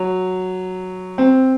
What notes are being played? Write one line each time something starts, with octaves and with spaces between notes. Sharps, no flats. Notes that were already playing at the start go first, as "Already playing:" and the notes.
Already playing: F#3
C4